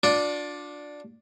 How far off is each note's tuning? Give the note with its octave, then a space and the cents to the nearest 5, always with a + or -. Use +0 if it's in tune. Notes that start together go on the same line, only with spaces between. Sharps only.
D4 +0 F4 +45 D5 +0